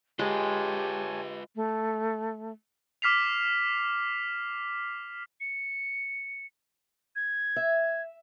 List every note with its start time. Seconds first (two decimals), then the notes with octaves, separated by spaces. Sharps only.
0.19 G#3 F4 G4 B4 C#5 G#5 A5
1.56 A3
3.02 D6 F6 B6 C7 F7
5.41 C#7
7.16 G#6
7.56 E5